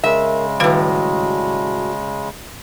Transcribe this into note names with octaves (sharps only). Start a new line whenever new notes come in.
C#3 G#3 A#4 E5
A2 D#3 G3 F#4 B4 F5